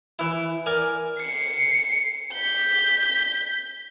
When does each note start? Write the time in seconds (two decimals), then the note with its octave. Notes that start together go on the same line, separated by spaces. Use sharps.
0.19 E3 E4
0.66 A#4 D5 G#5
1.19 C7 C#7
2.33 G6 B6